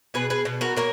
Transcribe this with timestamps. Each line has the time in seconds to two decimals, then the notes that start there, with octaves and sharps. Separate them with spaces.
0.14 B2 G#4 B4
0.30 G#4 B4
0.45 B2
0.61 F#4 A#4
0.77 A#3 A#4 C#5